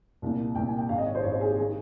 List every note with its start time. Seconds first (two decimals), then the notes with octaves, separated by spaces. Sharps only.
0.22 C2 A#2
0.55 C2 A#2 G5
0.67 G#5
0.78 G5
0.89 G#1 G#2 D#3 F5
0.98 D#5
1.06 C#5
1.15 C5
1.23 G#1 G#2 D#3 C#5
1.32 C5
1.41 G#4
1.49 G4
1.57 G#4
1.60 D#3